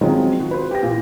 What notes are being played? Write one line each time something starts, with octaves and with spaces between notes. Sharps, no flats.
C3 D#3 F3 F#3 G#3
F#4
B4 C5
G4 G5 A#6
A#2 E3